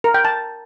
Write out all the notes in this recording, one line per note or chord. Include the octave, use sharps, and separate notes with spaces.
A#4
G5
A5